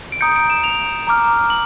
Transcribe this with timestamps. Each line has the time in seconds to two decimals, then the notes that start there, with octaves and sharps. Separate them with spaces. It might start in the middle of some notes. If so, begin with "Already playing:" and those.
0.12 D7
0.21 A#5 D#6 G6 C#7
0.36 D7
0.50 E7
0.64 F7
1.07 A#5 D6 F6
1.50 F#7